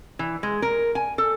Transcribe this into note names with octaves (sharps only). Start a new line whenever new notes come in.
E3
G#3
A#4
G#5
A4